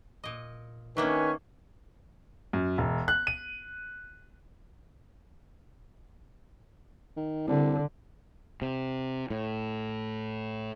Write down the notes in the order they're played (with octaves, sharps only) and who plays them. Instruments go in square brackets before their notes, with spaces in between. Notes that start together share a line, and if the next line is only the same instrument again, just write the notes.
[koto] A#2 D#5
[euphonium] D#3 [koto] A3 A#3 D4 [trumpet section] C#4 G#5 C#6 [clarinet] B4
[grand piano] F#2
E1
F#6
D#7
[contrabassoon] D#3
[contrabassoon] C2 [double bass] D3
[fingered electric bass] C3
A2